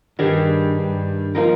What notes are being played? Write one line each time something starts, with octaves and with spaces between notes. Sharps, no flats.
G2 D#3 G3 D4 G#4
G2
F3 A#3 D#4 A#4